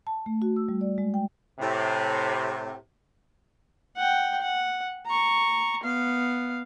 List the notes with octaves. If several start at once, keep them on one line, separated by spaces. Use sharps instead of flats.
A5
A3
F#4
E6
G3
D5
G#3
G5
A2 C3
F#5 G5
F#5
A#5 C#6
B3 F5